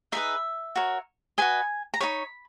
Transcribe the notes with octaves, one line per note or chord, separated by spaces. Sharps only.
D#4 G#4 B4 E5
F#4 A#4 C#5
F#4 B4 D#5 G#5
A#5
D#4 G#4 C#5 B5